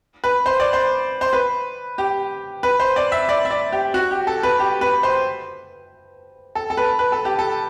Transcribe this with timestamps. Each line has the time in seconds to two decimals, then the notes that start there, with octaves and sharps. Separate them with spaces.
0.24 B4
0.46 C5
0.60 D5
0.73 C5
1.21 C5
1.33 B4
1.98 G4
2.63 B4
2.80 C5
2.96 D5
3.12 E5
3.29 D5
3.45 E5
3.51 D5
3.72 G4
3.94 F#4
4.11 G4
4.27 A4
4.43 B4
4.59 G4
4.81 B4
5.03 C5
6.55 A4
6.70 A4
6.77 B4
6.99 B4
7.12 A4
7.25 G4
7.39 A4